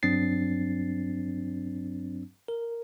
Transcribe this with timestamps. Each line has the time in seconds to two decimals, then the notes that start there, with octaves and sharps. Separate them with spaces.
0.03 G2 F#3 C4 D4 A6 C7
2.48 A#4